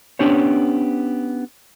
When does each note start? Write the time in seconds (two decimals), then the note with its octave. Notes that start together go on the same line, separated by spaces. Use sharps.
0.19 B3 C#4 D4 G4 C5 C#5